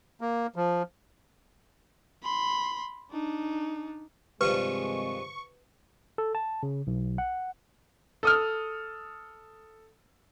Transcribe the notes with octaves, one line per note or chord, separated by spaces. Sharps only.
A#3
F3
B5 C6
D4 D#4
G2 C3 D#3 F3 G#3 D4 B4 C#6
A4
A5
C#3
B1
F#5
A4 D#6 F6